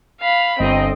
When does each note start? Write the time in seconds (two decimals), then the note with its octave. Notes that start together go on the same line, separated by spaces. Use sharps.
0.21 F5 B5
0.59 G1 C4 D#5